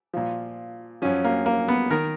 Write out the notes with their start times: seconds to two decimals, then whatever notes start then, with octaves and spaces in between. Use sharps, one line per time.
0.14 A#2 F3
1.02 F#2 F3 C#4
1.25 A#3
1.46 A#3
1.68 B3
1.91 D#3 A#4